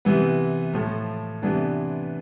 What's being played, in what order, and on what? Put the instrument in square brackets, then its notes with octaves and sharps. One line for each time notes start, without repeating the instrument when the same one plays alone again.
[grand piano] C3 E3 B3
A2 F3 A3
C3 E3 B3 D4